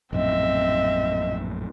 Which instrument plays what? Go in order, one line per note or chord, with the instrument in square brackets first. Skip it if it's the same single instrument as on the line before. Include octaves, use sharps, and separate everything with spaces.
[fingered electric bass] A#1 F#2 A2 [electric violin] C4 E5 [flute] D#5